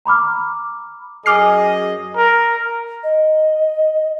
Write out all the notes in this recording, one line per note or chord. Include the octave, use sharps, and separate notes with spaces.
A#5 B5 D6 F6
F#2 G#4 D#5 D6 F6 C7
A#4
D#5